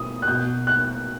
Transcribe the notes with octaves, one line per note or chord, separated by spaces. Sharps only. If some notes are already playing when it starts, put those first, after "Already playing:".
Already playing: B2 D#6
F#6
B2 G6
F#6